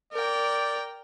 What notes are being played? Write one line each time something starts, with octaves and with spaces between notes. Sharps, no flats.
A#4 D5 G5